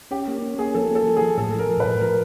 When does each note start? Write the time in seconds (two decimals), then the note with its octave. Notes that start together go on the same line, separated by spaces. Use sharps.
0.11 C#4 G4
0.28 A#3
0.42 C#4
0.58 A#3 G#4
0.74 F3 A4
0.91 A#3 A4
1.07 F3
1.17 G#4
1.21 F3
1.38 A2 A4
1.54 F3 A#4
1.70 F3
1.80 B4
1.85 A2
2.01 F3 A#4